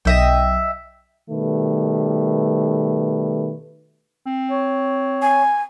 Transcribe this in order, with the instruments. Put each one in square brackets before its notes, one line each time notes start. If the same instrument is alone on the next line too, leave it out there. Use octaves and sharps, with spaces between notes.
[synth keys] B1 [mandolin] D#5 E5 G5
[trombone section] B2 D#3 G3 A3 B4
[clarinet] C4
[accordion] C#5
[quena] G#5